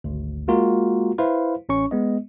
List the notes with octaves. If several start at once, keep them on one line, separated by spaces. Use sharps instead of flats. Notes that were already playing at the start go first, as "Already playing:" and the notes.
G#1 D2
G#3 A#3 F4 F#4 A#4
E4 B4 C5 F5
A1 C#4 C#6
G#3 B3 D#5